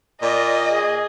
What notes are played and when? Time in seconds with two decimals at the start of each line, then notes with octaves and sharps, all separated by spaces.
0.22 A#2 D5 D#5
0.70 G#4